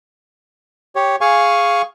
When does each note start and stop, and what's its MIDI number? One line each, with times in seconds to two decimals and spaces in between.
0.96 1.16 67
0.96 1.16 73
1.21 1.82 68
1.21 1.82 77
1.21 1.82 80
1.21 1.82 85